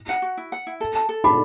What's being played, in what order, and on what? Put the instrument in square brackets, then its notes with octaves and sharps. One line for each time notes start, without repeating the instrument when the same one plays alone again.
[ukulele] F#5
F#4
E4
F#5
E4
A4
A5
A4
[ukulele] D4 [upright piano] B5